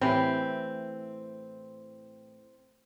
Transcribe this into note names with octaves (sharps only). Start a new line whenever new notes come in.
A2 E3 C4 G4